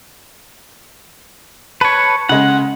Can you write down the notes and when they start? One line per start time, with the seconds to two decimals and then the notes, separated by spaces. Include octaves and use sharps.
1.81 B4 C#5 A5
2.29 C#3 G#3 F#5